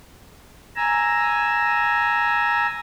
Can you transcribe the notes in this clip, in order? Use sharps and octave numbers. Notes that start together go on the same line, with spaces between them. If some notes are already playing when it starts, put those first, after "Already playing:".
G#5 A#5 E6